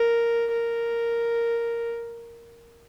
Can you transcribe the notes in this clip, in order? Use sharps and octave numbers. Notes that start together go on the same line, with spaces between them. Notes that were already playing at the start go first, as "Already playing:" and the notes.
Already playing: A#4
A#4